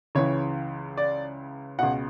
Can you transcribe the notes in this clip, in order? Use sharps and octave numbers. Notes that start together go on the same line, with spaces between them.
C#2 C#3 E3 C#5
D5
C#2 B2 F#5